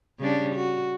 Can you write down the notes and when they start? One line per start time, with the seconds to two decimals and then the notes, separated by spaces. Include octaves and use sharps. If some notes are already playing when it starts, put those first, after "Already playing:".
0.19 C#3 G3 D4
0.55 F#4